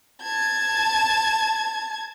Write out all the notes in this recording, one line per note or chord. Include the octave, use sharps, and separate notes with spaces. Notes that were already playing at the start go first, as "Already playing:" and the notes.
A5 G#6